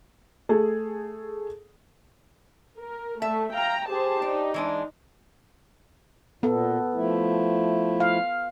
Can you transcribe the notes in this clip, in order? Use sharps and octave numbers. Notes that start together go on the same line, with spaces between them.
A3 G#4
A#4
A3 E5 A5
F5 G5 A#5
G4 G#4 C5 A5
D4 D#4
E3 G#3 D4
A#2 B3 A4
F3 A3 E4
F5